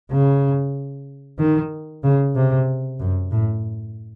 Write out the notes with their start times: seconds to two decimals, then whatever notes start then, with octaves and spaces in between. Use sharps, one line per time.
0.11 C#3
1.39 D#3
2.03 C#3
2.35 C3
3.00 F#2
3.31 A2